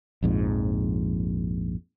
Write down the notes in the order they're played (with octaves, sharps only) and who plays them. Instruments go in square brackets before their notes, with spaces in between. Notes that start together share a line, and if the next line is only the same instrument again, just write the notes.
[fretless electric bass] A#1 F2 G#2